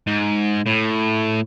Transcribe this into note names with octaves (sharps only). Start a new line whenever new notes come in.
G#2
A2